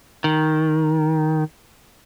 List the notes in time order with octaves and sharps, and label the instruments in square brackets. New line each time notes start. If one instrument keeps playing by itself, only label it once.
[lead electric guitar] D#3